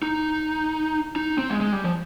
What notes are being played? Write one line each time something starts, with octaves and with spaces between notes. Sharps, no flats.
D#4
D#4
C4
G#3
G#3
G3
F3